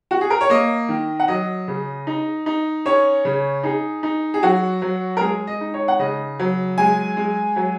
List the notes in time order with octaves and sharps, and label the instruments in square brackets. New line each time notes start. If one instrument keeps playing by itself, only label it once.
[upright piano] F#4
G#4
A#4
C#5
A#3 D#5
D#3
F#5
F#3 D#5
C#3
D#4
D#4
C#4 C#5
C#3
D#4 G#4
D#4
G#4
F#3 F#4
F#3
A#4
G#3 G#4
D#5
D#4
C#5
F#5
C#3 D#5
F#3
G#3 G#5
G#3
F#3